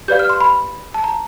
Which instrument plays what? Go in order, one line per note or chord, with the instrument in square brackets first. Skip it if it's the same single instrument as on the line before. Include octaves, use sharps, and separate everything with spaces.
[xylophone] G4 B4 D5 F5 G6
F6
C6
B5
A5
A#5